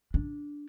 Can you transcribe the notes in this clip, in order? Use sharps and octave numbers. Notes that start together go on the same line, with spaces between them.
D4